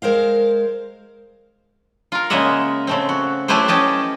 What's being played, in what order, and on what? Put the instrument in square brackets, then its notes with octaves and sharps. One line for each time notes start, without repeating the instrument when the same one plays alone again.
[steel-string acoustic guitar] G#3 A#4 C5 F5
[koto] F4 A#4
C#3 G#3 A#3 D#5 E5 F#5
C#3 A3 C4
F#4
F#3 A3 E4 G4 B4 C5
C#4 G4 D#5 A5